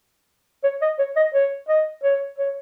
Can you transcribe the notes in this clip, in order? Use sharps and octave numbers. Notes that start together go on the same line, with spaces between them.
C#5
D#5
C#5
D#5
C#5
D#5
C#5
C#5